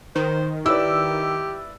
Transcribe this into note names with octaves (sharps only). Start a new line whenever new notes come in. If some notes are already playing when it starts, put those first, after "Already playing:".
D#3 C5
E4 G4 B4 D5 E6